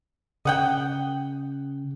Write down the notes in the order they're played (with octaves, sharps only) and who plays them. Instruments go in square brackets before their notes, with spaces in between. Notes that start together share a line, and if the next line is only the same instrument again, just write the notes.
[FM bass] C#3 [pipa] D#5 F#5 G5